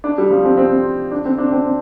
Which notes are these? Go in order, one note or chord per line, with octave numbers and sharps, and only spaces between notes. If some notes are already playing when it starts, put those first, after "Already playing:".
D4
G3
F3
C4
C4
D4
C4
D4
C4